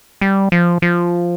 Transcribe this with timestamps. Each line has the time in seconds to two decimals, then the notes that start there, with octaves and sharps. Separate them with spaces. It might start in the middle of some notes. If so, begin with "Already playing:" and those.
0.21 G3
0.52 F3
0.82 F3